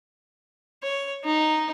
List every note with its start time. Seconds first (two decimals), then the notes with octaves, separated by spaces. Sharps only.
0.83 C#5
1.24 D#4